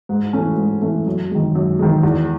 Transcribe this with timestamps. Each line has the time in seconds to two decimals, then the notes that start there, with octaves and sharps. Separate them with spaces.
0.09 G#2
0.33 E3 A3 C#4
0.57 G#2
0.82 E3 A3 C#4
1.06 F#2
1.31 D#3 G#3
1.55 F#2
1.79 D#3 G#3
2.03 E2